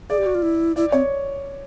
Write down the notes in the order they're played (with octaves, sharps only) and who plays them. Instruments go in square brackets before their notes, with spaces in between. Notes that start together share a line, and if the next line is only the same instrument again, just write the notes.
[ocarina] G#4 [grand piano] D5
[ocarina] G4
F#4
F4
E4
[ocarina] E4 [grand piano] D5
[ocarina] C4 [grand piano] C#5